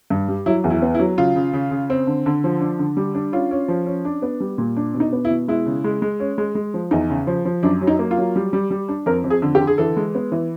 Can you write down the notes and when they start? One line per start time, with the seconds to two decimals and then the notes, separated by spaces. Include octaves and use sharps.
0.10 G2
0.28 G3
0.46 F#3 E4
0.64 E2
0.70 E4
0.82 B3
0.95 E4
0.99 F#3
1.18 C#3 F4
1.36 C#3
1.53 C#3
1.71 C#3
1.90 C4
2.07 D3
2.26 D3
2.44 F3
2.61 D4
2.79 D3
2.97 G3
3.15 D4
3.32 C#4 F4
3.51 C#4
3.68 F3
3.87 C#4
4.05 D4
4.22 B3
4.40 G3
4.58 A#2
4.77 D4
4.94 B2
5.00 D#4
5.13 B3
5.25 E4
5.30 B2
5.48 G#3 E4
5.66 C#3
5.84 G#3
6.02 G#3
6.20 C#4
6.38 G#3
6.55 G#3
6.74 F3
6.91 E2 D#4
7.09 C#3
7.27 F3
7.45 F3
7.63 F#2 D4
7.81 F#3
7.87 D#4
7.99 A#3
8.11 F4
8.18 F#3
8.36 G3
8.53 G3
8.71 G3
8.89 D4
9.06 F2 A#4
9.24 F2
9.30 G#4
9.42 D3
9.55 G4
9.60 D3
9.67 G#4
9.78 E3 A4
9.97 G#3
10.15 B3
10.32 E3